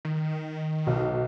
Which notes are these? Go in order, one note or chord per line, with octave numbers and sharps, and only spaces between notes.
D#3
B1